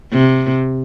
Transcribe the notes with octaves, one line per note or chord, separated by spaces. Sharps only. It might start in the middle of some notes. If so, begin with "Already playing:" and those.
C3